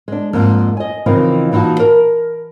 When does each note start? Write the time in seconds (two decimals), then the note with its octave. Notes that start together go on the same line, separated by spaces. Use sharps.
0.08 G#3 D4
0.33 F2 G#2 A#3
0.77 D#5 G#5
1.06 C#3 E3 F3 C4 D#4 A#4
1.52 A#2 E3 D#4 F#4 A5
1.80 A#4